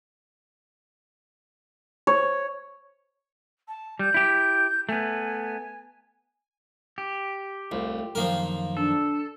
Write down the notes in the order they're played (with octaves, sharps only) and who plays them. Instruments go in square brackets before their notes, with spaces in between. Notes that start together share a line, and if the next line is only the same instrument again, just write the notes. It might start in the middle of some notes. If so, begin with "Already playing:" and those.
[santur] C#5
[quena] A5
[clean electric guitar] G3 [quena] G6
[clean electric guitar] E4 G4
[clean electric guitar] A3 B3 [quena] G#5
[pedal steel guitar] G4
[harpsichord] C2 [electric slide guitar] A3 F4
[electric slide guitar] F#2 D#3 F5 [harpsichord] F3 A#3 A#4
[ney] D4 [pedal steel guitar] A4